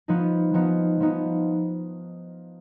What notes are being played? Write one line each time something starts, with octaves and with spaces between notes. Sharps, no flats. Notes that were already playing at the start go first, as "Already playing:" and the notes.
F3 B3 D#4
F3 B3 D#4
F3 B3 D#4